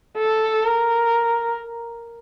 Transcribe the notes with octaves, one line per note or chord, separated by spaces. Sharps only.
A4
A#4